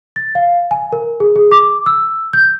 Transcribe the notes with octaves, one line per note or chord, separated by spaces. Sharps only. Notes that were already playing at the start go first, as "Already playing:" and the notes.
A6
F5
G#5
A#4
G#4
G#4
D6
E6
G6